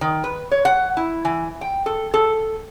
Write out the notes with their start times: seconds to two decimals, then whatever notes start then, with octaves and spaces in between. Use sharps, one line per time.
0.01 D#3
0.24 B4
0.51 C#5
0.65 F#5
0.97 E4
1.25 E3
1.61 G5
1.86 A4
2.14 A4